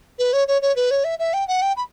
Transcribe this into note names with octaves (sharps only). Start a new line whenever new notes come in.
B4
C#5
C#5
C#5
B4
C#5
E5
E5
G5
F#5
G5
B5